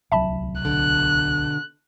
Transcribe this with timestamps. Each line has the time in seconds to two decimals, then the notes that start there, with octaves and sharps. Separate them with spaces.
0.12 D1 C2 F#3 E5 A5 B5
0.61 B2 D3 F#6